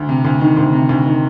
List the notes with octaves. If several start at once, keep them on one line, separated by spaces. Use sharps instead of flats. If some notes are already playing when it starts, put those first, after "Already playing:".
Already playing: D2
C3
D2
D#3
D2
C3
D2
D#3